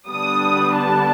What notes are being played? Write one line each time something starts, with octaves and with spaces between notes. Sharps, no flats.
D3 G3 B3 D4 D#6
A5